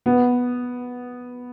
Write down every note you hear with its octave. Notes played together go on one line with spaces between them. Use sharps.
B3